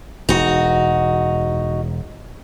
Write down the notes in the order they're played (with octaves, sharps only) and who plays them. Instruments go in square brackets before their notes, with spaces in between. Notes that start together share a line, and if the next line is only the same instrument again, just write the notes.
[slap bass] E1 [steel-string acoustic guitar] D#4 F#4